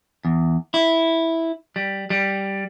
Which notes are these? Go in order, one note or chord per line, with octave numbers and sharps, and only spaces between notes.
E2
E4
G3
G3